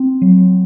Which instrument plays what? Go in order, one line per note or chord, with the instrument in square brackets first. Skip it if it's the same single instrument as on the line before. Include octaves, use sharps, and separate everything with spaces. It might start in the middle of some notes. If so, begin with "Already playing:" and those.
Already playing: [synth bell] C4
F#3